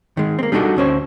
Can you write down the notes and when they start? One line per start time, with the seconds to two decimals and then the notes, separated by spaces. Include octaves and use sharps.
0.17 D#3 G#3
0.39 A#3 C4
0.52 G3 D4 D#4 F4 F#4 A4
0.77 D2 C#4 C5 C#5